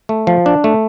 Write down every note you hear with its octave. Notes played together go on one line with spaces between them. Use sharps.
A3
F3
D4
A3